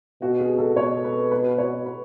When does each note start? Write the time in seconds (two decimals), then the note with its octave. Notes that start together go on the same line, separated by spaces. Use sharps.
0.22 B2 F#4
0.40 G#4
0.58 A4
0.76 B2 C#5
1.04 B4
1.31 B4
1.58 C#5
1.86 B4